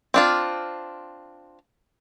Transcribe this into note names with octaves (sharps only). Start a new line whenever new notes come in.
C4 D4 F4